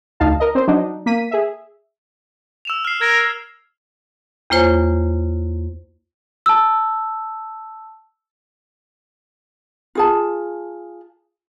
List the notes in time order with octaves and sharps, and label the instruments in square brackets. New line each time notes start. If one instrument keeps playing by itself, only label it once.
[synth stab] D2 D#4 F5 A5
A#4 D#5
C4 C5
F#3 D4 D#4
A#3 B6 D#7
G#4 E5
[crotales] E6 E7 F7
F6 C7
[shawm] A#4 [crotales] G#6
[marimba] E2 A#3 F4 C5 C#5 G#5
[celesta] A5 E6
[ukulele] F4 G#4 A5